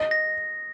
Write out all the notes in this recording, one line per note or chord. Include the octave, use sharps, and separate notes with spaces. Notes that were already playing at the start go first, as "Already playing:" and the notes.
Already playing: D#5
A#6